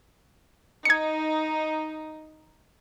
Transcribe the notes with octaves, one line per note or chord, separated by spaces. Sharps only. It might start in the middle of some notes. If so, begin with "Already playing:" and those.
D#4 G#6 C#7